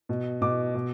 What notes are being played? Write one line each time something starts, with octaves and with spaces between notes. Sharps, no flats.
B2
B2 D6
B2